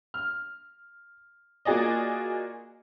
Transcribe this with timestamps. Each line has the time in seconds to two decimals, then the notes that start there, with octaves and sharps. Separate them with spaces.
0.14 F6
1.65 A#3 F4 F#4 G#4 D5 D#5